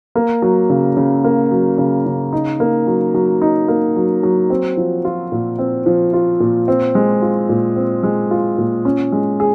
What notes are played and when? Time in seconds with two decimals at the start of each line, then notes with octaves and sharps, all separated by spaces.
0.15 A#3
0.42 F#3
0.70 C#3
0.97 C#3
1.24 A#3
1.51 F#3
1.78 C#3
2.06 C#3
2.33 D#4
2.60 A#3
2.87 F#3
3.14 F#3
3.42 D#4
3.68 A#3
3.96 F#3
4.23 F#3
4.50 C4
4.77 F3
5.05 F4
5.32 A#2
5.59 C4
5.86 F3
6.13 F4
6.40 A#2
6.68 C4
6.95 G#3
7.22 F4
7.49 A#2
7.76 C4
8.03 G#3
8.31 F4
8.58 A#2
8.85 C#4
9.12 G#3
9.40 G#4